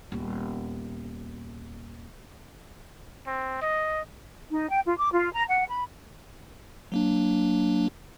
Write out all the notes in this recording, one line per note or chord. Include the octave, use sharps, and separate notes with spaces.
D#1 B3
C4
D#5
D#4
G5
F4
D6
F4
A#5
F#5
B5
F#3 A#3 D4